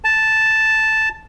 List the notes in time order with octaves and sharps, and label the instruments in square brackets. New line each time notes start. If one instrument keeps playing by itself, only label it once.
[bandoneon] A5